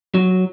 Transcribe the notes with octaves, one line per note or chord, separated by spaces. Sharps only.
F#3